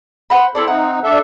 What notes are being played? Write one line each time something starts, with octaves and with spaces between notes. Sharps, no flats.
C5 F#5 B5
C4 E4 A4 C5 D5
C4 D#4 F#5
D4 A4 E5